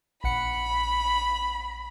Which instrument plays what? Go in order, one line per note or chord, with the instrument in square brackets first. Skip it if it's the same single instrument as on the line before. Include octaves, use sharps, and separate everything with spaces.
[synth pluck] A#1 F#5 C#7 [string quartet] B5